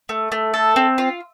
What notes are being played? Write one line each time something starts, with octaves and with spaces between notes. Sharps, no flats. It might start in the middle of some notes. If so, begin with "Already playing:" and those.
A3
A3
A4
C4
F4